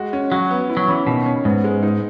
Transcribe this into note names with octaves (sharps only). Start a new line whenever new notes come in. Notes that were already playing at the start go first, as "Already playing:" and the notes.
Already playing: G#3 F#4
C#4
F#3 F#4
B3
E4
F#3
E3 C#4
B2 D#3
C#4
G#2 B3
G#3
D#4